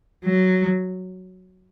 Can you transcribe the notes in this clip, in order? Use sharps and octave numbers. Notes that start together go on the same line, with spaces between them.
F#3